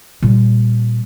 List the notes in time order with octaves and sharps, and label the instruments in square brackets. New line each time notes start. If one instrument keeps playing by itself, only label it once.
[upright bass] A#2 G3